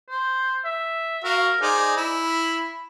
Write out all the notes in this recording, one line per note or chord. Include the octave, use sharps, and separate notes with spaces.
C5
E5
F#4 A#4 F5
D#4 G#4 C5 D5
E4
B5